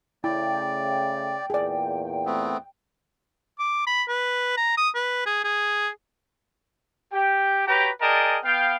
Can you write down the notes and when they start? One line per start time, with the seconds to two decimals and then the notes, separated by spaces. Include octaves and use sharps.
0.24 C#3 A3 E4 D5 G5
1.50 E2 A#2 G#4 D5
2.26 A3 B3 C4
3.59 D6
3.87 B5
4.09 B4
4.57 A#5
4.78 D#6
4.95 B4
5.26 G#4
5.44 G#4
7.13 G4 G5
7.67 F#4 G4 B4 C#5 G5 A#5
8.01 G#4 A#4 D5 D#5 G5 A5
8.44 B3 F5 G5